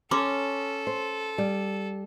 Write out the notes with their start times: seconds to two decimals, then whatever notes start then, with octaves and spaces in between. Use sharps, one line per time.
0.11 C#4 A4 A#5 C6 D6
0.87 C5
1.38 G3